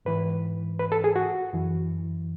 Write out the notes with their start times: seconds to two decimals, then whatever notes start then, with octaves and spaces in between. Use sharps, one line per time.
0.05 G#2 E3 B4
0.79 B4
0.92 A4
1.04 G#4
1.16 F#4
1.53 F#2 E3